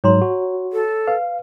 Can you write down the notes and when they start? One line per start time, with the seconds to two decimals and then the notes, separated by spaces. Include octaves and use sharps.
0.04 G#2 F#3 C#5 A#5 C6
0.22 F#4
0.73 A4
1.07 B4 F5